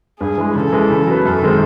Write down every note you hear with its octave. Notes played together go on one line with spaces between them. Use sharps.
G2 G#4
E3 G#3
C#3 A4
E3 G#3
C#3
F#3 B3
F#2 A4
D#3 G#3 C4